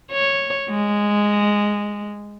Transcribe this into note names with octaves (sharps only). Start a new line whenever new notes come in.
C#5
G#3